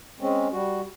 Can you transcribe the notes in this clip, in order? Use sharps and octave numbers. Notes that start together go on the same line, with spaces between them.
G#3 C4 C#4
G3 F#4